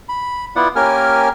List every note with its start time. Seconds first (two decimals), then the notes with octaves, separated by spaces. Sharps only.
0.09 B5
0.56 B3 E4 F4 D5 F#5
0.76 A#3 C#4 G4 A#4 G#5 F6